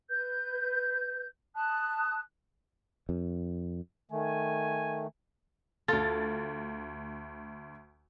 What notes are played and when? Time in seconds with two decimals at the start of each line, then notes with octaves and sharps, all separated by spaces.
0.10 B4 G6
1.55 A5 D#6 F#6
3.09 F2
4.11 D#3 A3 G#5
5.88 D2 F4 A4 A6